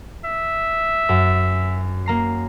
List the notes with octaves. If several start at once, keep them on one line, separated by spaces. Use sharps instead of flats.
E5
F#2
A#3 A#5 C7